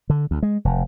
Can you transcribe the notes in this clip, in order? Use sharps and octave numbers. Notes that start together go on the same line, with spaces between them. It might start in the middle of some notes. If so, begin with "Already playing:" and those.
D3
D2
G#3
F1